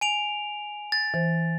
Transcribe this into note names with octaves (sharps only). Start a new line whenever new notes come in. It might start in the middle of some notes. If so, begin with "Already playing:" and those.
G#5 D7 F7
A6
E3 C5